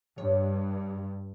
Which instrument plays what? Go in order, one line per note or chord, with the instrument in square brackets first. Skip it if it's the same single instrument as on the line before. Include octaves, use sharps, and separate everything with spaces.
[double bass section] G2 [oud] C#5